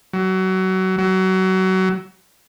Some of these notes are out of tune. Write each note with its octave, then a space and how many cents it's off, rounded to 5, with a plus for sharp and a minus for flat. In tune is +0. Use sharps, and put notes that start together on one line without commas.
F#3 +25
F#3 +25